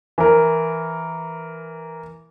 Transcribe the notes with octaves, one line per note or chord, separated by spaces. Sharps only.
E3 A#4